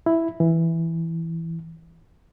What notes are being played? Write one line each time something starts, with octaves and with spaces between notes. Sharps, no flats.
E4
E3